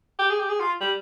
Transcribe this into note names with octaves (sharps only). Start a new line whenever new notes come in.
G4
G#4
G4
G#4
F4
G3